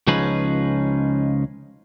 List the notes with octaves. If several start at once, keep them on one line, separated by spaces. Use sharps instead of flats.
C#2 F3 C#4 D#4 G#4 B4